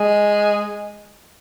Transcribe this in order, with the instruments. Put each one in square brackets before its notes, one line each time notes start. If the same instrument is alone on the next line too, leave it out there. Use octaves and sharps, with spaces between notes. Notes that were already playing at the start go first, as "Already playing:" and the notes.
Already playing: [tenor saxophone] G#3